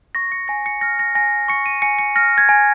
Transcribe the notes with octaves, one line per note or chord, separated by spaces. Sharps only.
C#6 A#6
C#7
G#5 A#6
C#7
F6 A#6
A#6
G#5 A#6
C#6 C#7
D#7
G#5 C#7
C#7
F6 A#6
G#6
G#5